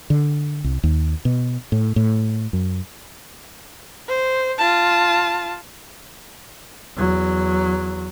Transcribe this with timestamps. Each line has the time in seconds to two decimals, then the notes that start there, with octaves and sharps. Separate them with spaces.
0.10 D3
0.64 C2
0.83 D#2
1.25 B2
1.72 A2
1.96 A2
2.53 F#2
4.09 C5
4.58 F4 A5
6.97 E2 F#3